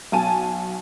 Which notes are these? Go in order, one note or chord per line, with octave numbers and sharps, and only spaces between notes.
B1 G#5 A5 D#7